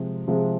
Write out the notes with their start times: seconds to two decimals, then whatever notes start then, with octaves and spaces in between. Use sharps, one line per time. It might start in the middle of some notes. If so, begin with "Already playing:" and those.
Already playing: C3 F3 G#3
0.28 C3 F3 G#3